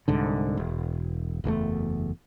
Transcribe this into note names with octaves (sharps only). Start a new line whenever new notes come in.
C2 G#2 D3
E1
F#1 E2 C#3 A3